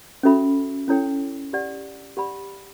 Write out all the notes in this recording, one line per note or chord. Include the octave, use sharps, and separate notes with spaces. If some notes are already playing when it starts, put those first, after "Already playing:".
C#4 F#4 A4 E5 B5
C#4 E4 A4 C#5 G5
G4 D5 F#5
G4 D5 F#5 B5